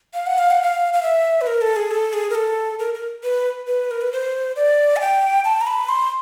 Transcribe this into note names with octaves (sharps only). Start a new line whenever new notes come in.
F5
F#5
F5
F#5
F5
F5
E5
B4
A#4
A4
G#4
A4
G#4
A#4
A4
A#4
A#4
B4
B4
A#4
B4
C5
D5
G#5
G5
A5
A#5
B5
C6